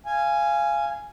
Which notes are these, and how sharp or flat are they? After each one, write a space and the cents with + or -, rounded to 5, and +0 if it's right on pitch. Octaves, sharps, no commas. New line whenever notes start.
F5 -25 G#5 +0